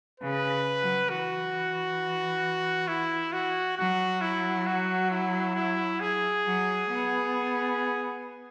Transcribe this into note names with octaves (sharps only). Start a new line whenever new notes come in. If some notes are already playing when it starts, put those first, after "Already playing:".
C#3 B4
F#3
E3 F#4
E4
F#4
F#3 F#4
E4
F#4
E4
E4
G#4
F#3
B3